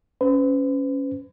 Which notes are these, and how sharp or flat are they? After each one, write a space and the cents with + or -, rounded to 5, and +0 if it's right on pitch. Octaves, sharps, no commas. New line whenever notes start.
C#4 +0 B4 +40